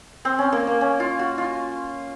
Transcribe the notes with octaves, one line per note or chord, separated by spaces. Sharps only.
C4
C#4
A#3
A#3
C#4
F4
F#4
F4